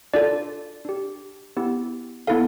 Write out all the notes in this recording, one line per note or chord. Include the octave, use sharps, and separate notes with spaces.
D4 F4 A4 D5
D4 G4
B3 E4 G4
B3 E4 A4 F5